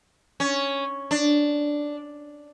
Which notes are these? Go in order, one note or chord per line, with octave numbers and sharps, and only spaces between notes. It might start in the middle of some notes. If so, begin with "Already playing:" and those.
C#4
D4